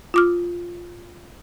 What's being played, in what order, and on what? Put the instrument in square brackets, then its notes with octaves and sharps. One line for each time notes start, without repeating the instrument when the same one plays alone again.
[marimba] F4 D6 F6